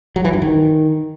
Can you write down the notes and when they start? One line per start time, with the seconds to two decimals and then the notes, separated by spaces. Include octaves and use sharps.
0.16 F#3
0.25 E3
0.33 G2
0.42 D#3